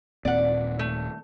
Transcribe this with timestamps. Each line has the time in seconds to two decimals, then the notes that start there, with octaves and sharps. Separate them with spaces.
0.25 D#1 A#2 C4 D5 F#5
0.79 A3